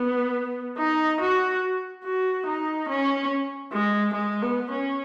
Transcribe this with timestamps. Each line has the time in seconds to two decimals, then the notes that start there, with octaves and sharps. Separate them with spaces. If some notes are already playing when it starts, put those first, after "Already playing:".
Already playing: B3
0.78 D#4
1.21 F#4
2.04 F#4
2.46 D#4
2.89 C#4
3.72 G#3
4.14 G#3
4.42 B3
4.71 C#4